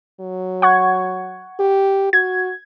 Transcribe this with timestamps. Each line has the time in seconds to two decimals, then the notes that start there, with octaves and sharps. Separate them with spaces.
0.21 F#3
0.62 F#5 C#6 G#6
1.59 G4
2.13 F#4 G#6